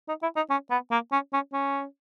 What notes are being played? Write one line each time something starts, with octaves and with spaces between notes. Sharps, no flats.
D#4
E4
D#4
C#4
B3
A#3
C#4
C#4
C#4